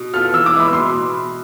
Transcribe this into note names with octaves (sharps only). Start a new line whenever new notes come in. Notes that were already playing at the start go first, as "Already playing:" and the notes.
Already playing: B2
B3 F4 A4 F6
E3 E6
D6
G#3 B3 E4
B5
B2 C6